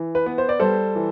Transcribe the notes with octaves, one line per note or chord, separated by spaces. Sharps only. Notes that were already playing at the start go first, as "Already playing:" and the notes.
Already playing: E3
B4
B3
C5
D5
G3 A4 C5
E3